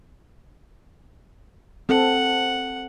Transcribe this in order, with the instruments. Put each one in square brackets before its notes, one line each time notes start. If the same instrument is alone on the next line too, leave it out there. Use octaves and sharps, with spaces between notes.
[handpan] C4 A4 [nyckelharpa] F#5